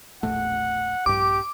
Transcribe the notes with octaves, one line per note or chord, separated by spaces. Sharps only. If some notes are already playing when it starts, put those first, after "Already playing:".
E1 A#1 A3 F#5
A#1 G2 G4 D6